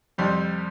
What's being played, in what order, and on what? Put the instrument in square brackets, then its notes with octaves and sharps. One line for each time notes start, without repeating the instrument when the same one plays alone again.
[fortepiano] F2 C3 G3